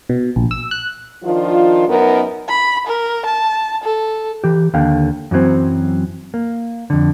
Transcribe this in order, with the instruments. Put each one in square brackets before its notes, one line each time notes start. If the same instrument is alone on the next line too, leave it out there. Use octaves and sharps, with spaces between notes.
[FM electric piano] B2
A#1
E6
F#6
[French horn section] D#3 F3 D4 F4
F#2 B3 D#4 A#4
[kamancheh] B5
A#4
A5
A4
[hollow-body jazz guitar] E3 G4
D#2 D3 F5 G5
F#2 E3 F#3 C4
A#3
F2 D3